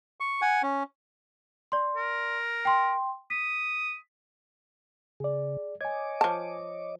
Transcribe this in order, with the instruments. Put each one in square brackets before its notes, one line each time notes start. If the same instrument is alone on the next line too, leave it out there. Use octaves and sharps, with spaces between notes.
[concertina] C#6
F#5 G#5
C#4
[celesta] D5 C6
[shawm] A#4
[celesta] G5 C6
[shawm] D#6 [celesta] B6
[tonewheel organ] C#3 [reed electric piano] G#4 D5
[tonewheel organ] C#5 D#5 D6 [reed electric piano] G#5 G#6
[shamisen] F3 A5